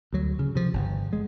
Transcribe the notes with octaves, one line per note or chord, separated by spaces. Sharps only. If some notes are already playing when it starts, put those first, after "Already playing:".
D2 F#3
C#3
C3 F3
G1
G#3